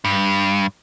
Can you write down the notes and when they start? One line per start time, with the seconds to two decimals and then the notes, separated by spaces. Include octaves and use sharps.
0.05 G2